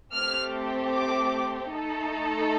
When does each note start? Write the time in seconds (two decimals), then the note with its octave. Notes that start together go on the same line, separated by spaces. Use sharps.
0.14 A3 C4 G4 F6
0.92 D6
1.72 A3 D#4 A4